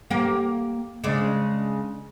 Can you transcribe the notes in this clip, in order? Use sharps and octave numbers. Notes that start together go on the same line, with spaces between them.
A#3 G4
C#3 G#3 D4